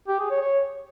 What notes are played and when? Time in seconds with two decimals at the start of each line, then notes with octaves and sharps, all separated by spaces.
0.08 G4
0.19 G#4
0.30 C#5
0.42 C#5